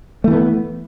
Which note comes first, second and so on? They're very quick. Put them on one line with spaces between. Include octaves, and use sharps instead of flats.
A3 E3 B3